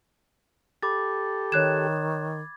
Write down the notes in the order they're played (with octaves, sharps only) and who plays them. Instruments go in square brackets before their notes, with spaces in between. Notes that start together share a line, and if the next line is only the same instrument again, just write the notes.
[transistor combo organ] G4 A4 [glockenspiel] B5 D6 A6
[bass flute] D#3 [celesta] C#5 F#6 E7 [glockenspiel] G#6